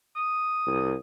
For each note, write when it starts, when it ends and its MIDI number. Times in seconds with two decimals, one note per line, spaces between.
0.16 0.98 87
0.66 0.94 36